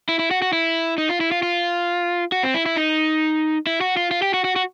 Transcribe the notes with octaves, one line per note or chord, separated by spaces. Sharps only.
E4
E4
F#4
F#4
E4
D#4
F4
E4
F4
F4
F#4
C4
E4
E4
D#4
E4
F#4
F4
F4
G4
F#4
F#4
F#4